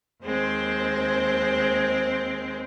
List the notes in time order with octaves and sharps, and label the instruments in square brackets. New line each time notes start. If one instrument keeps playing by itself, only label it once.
[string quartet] D#2 G#3 C4 C5